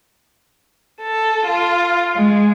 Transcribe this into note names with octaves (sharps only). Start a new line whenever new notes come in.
A4
F4
G#3